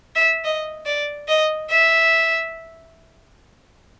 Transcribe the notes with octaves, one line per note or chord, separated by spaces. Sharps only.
E5
D#5
D5
D#5
E5